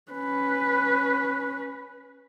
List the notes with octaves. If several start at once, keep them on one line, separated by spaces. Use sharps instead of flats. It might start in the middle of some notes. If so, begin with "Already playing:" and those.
C#4 B4